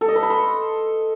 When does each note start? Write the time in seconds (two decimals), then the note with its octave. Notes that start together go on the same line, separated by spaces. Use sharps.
0.01 A4
0.08 D#5
0.16 B4
0.23 B5
0.30 C6